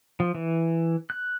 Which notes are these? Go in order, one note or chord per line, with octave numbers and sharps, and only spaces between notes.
F3
E3
F#6